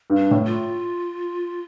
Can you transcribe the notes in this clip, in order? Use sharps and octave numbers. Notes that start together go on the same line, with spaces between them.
G2
D4
A2
F4